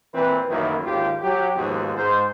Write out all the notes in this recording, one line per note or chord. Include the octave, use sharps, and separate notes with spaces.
A#2 E3 C4 B4
A1 F#2 D#3 A#3 E4
G#1 D#2 F4 G4
F#3 G4
D#2 G#2 B2 F3
G#2 C5